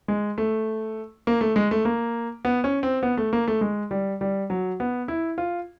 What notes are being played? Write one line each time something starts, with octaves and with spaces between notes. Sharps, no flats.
G#3
A3
A#3
A3
G#3
A3
A#3
B3
C#4
C4
B3
A3
A#3
A3
G#3
G3
G3
F#3
B3
E4
F4